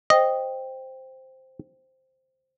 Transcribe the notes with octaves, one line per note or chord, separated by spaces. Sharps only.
C5 D#5 G5